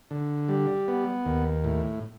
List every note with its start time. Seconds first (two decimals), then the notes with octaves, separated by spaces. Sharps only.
0.11 D3
0.48 G3
0.88 B3
1.25 D#2
1.64 A2